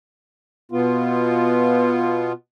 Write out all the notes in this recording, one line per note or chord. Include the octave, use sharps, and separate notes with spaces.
B2 B3 F4